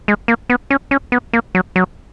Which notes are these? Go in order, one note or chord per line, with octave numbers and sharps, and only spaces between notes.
G#3
A#3
B3
C#4
C#4
B3
A#3
F#3
F#3